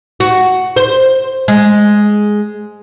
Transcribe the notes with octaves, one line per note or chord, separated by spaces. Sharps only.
F#4
C5
G#3